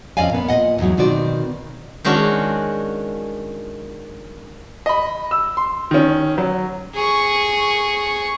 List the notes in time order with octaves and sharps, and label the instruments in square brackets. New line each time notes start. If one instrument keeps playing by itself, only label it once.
[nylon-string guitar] F2 C#4 D5 D#5 F5 G#5
A#2 B3
A#2 D#5 F#5
E2 G#2 F#3
B2 D#3 C4 F#4 D5
[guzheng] D#3 G#3 C#4 D4 F#4
[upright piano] D#5 B5
E6
C6
D#3 C#4
F#3
[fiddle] G#4 C#6